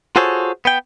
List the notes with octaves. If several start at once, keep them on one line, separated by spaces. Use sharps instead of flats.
F4 F#4 G#4 A4 C5 C#5
B3 G5